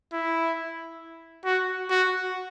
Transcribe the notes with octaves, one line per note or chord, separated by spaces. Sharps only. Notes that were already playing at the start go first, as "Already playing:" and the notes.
E4
F#4
F#4